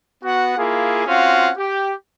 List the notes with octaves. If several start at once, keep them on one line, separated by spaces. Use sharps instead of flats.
B3 F#4 F#5
A#3 E4 F4 G#4
C4 C#4 F4 F#4 F5 F#5
G4